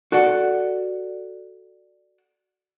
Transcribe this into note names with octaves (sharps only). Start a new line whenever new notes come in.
F#4 A4 D5 F#5